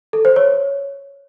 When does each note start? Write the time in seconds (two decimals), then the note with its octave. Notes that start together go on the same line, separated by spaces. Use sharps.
0.13 A4
0.25 C5
0.36 C#5